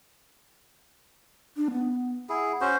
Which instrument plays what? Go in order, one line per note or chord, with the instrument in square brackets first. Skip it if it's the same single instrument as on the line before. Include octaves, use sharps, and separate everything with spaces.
[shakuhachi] D4
B3
[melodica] E4 G#4 [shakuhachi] F#5
[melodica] C#4 F#4 C5